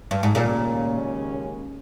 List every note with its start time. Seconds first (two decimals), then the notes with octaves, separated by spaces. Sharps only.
0.11 G2
0.23 G#2
0.35 D#2 A#2 C#3 G#3 C#4